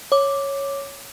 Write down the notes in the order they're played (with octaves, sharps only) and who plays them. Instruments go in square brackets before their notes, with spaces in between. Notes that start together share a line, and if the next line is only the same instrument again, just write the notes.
[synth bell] C#5 D6